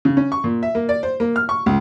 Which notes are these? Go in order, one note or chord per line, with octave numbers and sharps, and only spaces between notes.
C#3
C#4
C#6
A#2
E5
A#3
D5
C5
A#3
F6
C#6
C#2